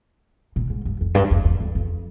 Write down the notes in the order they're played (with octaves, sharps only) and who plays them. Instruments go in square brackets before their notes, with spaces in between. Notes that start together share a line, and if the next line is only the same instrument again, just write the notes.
[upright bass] A#2
G#2
G2
F2
G2
F2
E2
F2
F2